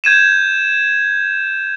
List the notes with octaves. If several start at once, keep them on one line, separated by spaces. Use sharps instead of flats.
G6 G#6 D#7 E7